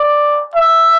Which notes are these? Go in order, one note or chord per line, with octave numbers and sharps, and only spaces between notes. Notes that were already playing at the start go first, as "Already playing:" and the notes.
Already playing: D5
E5